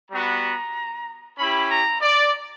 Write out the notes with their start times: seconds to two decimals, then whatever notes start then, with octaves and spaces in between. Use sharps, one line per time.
0.11 G3 B3 F#4 A#5
1.38 C#4 E4 G4 B5
1.70 A#5
2.02 D5